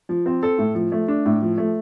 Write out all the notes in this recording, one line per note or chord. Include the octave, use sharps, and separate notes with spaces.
F3
C4
A4
A2
F3
A3
D4
A2
F3
A3